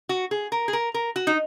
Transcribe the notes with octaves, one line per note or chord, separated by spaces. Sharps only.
F#4
G#4
A#4
G#4
A#4
A#4
F#4
D#4